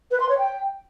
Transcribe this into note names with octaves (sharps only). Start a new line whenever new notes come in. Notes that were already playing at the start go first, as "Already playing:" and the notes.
B4
C6
C#5
G5